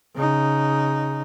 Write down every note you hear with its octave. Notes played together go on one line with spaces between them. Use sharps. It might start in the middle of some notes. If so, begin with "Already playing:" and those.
C#3 D#4